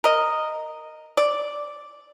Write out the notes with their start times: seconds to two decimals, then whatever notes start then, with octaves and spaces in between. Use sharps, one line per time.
0.04 A#4 D#5
1.17 D5